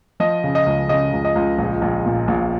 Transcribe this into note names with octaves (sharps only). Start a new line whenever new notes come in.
F3 D#5
C#3
D#5
C#2
C#3 D#5
C#2
D#5
C#2
A#1
A#1
A#2
A#1